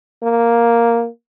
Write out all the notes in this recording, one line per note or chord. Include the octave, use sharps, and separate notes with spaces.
A#3